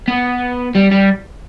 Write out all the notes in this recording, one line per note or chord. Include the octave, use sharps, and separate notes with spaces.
B3
G3
G3